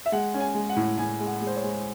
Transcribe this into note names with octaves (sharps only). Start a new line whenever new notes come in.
E5
G#3 F#5
C#4
G#5
G#3
F#5
A2
A2 G#5
G#3
F#5
G#3
C5
C#5
G#3